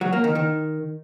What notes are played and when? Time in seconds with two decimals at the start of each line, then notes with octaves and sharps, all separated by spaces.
0.01 F#3
0.13 A#3
0.24 D#3
0.35 D#3